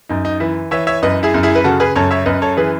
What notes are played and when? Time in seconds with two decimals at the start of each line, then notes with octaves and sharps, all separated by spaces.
0.09 F#2 D#4
0.25 D#4
0.40 E3 E4
0.71 E3 C#5 E5
0.87 C#5 E5
1.02 F#2 B4 D#5
1.23 E4 G#4
1.34 F#2
1.43 E4 G#4
1.55 B4
1.64 C#3 F#4 A4
1.80 G#4 B4
1.96 F#2 A4 C#5
2.11 C#5 E5
2.26 F#2 B4 D#5
2.42 A4 C#5
2.57 E3 G#4 B4